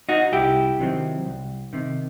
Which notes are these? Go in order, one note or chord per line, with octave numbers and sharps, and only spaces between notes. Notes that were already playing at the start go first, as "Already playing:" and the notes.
D#4 F#4
C2 E4 G4
C3 D#3 F#3 C4
C2
C3 D#3